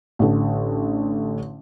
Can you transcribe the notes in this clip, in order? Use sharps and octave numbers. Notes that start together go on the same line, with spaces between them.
A1 D3